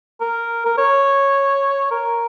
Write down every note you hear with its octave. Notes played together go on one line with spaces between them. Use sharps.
A#4
A#4
C#5
A#4